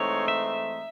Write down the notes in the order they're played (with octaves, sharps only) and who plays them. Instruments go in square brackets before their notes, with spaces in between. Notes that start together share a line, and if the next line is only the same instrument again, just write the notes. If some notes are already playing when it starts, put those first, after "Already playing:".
Already playing: [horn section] G#2 E3 A3 C4 D#4 [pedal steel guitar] C#5
[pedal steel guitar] E5